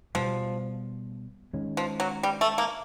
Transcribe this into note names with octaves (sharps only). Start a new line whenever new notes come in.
B2 F3 G3 B3
D#3 G#3 C#4
F3
F#3
G3
A3
A#3